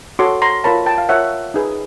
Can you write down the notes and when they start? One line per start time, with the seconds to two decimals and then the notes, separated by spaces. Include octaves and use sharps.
0.19 F#4 A4 C#5 C6 D6
0.42 A#5 C6
0.64 F4 A#4 C#5 A5 B5
0.86 G5 A5
0.98 F5
1.09 F4 A#4 C#5 E5 F#5
1.54 D#4 G#4 B4